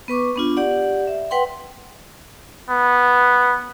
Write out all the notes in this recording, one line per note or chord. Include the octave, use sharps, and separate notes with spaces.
B3 B4 C#6 D6
B3 D4 F4
G4 D5 F#5
E5
B4 F#5 G5 C6
B3